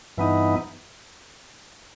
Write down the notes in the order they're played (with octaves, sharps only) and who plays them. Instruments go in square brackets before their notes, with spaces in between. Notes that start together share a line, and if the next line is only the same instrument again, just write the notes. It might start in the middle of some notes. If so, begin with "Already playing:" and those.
[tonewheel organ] G2 E3 B3 D#4